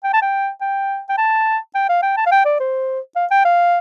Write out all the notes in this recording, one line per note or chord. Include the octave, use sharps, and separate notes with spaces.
G5
A5
G5
G5
G5
A5
G5
F5
G5
A5
F5
G5
D5
C5
F5
G5
F5